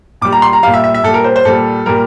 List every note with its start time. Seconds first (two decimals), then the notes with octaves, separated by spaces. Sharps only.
0.21 A#2 G3 D6
0.32 A#5
0.42 C6
0.53 A#5
0.63 A#2 G3 F5
0.74 E5
0.84 E5
0.94 E5
1.04 A#2 G3 A4
1.14 A#4
1.24 C5
1.36 C5
1.45 A#2 G3 A4
1.86 A#2 G3 A#4